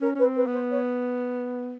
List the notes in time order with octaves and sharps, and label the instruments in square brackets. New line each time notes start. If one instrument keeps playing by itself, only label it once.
[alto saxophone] C#4 [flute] A#4
[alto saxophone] C#4 [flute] B4
[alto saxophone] C4
[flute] B4
[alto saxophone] B3
[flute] C5
C#5